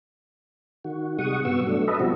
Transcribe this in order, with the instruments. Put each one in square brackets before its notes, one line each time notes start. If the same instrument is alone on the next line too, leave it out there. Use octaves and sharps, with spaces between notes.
[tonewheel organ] D#3 F#4
C3 G3 G#3 F#5 C#6 D#6
G2 B2 B3 F#4 C#6 E6
F#3 A3 D4
A4 B4 D#5 E5
B2 F3 G3 C4 F#4